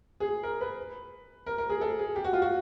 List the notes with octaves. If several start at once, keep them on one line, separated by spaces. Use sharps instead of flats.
G#4
A#4
B4
A#4
A#4
G#4
A4
G#4
G4
F#4
F4
F#4